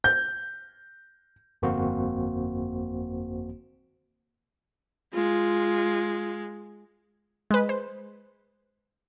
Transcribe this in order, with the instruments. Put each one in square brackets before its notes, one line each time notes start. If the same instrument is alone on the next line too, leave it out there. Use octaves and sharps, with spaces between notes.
[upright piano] G6
[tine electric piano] G1 F2 A#3 C4 F#4 C5
[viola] G#3 [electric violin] F4
[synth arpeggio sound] G#3 B4
C5